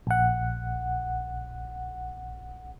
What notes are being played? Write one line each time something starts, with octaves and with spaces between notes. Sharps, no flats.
A#1 F#5